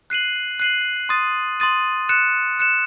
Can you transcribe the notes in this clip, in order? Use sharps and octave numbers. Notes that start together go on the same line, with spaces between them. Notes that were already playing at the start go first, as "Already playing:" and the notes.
F#6 C7 D#7 F#7
F#6 C7 D#7 F#7
C6 D#6 A6 D#7
C6 D#6 A6 D#7
F#6 C#7 E7
F#6 C#7 E7